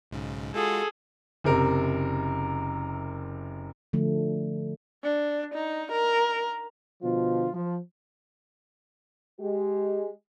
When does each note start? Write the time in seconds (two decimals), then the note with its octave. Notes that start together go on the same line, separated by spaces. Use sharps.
0.11 B1 G#2 C#3
0.54 G#3 F4 F#4 G#4 A4
1.44 F#1 C3 A#4
3.93 D3 F3 A3
5.04 D4
5.54 D#4
5.92 A#4
7.03 B2 D3 F3 F4
7.54 F3
9.40 G#3 G4